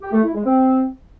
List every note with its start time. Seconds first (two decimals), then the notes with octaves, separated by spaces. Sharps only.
0.01 G4
0.12 A3
0.23 E4
0.35 G#3
0.46 C4